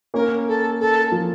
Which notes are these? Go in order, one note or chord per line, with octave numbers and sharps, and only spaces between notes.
A#3 C#4 A#4
A4
A4
F3